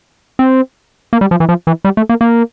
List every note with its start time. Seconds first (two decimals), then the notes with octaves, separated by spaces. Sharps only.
0.39 C4
1.13 A#3
1.21 G3
1.31 F3
1.40 E3
1.49 F3
1.67 E3
1.84 G3
1.97 A3
2.09 A#3
2.21 A#3